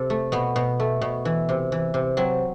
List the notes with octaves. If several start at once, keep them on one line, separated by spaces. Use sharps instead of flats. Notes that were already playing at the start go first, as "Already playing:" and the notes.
Already playing: C3 A4
A3
B2 B3
B2
A3
B2
E3
C3
E3
C3
F#3 C4